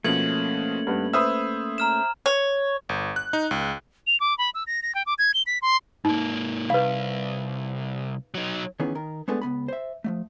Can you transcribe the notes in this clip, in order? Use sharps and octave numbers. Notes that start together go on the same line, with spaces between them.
B2 F3 A3 A#3 C#4 G#6 F#7
G2 B3
B4 C5 E5 D#6 E6
A#5 F6 E7
C#5
G1
F#6
D#4
C#2
F7
D6
B5
E6
A#6
A#6
G5
D6
G#6
G7
B6
C6
G#2 A#3 D#4
C2 B4 F5
F#3 D#4
D#3 E3 B3 C#4 G#4
D#3 A#4
G#3 A3 B3 D4 G#4 A4
C#2 B2 B3 B5
C5 E5
F3 F#3 A3